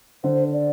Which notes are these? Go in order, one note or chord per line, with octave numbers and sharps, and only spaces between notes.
D3 C5
D5